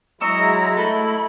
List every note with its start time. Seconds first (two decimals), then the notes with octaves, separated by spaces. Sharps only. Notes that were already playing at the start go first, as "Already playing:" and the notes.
0.21 F#3 G#3 E4 D#5 A#5 C#6 E6
0.77 A3 E4 A4 B5 G6